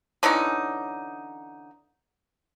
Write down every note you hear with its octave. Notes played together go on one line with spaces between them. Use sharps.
D3 E3 C#4 D#4